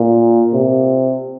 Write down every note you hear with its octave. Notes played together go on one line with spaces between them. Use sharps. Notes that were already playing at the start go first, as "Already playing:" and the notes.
Already playing: A#2
C3